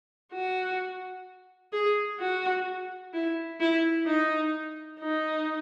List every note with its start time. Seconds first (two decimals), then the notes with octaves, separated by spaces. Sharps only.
0.32 F#4
1.73 G#4
2.20 F#4
3.13 E4
3.60 E4
4.06 D#4
5.00 D#4